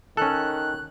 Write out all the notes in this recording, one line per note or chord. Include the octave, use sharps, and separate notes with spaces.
D#3 C#4 A4 F#6